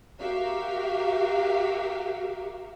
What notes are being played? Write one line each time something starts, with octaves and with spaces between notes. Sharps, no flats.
F#4 G4 A#4 E5 F5